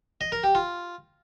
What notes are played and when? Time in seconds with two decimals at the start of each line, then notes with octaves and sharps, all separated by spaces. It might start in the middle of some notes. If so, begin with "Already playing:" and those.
0.21 D#5
0.32 A#4
0.44 G4
0.55 F4